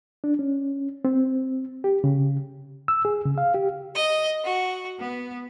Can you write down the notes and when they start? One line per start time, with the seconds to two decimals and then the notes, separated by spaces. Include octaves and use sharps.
0.24 D4
0.39 C#4
1.05 C4
1.84 G4
2.04 C#3
2.88 E6
3.05 G#4
3.25 C#3
3.38 F5
3.54 G4
3.94 D#5
4.45 F#4
4.99 B3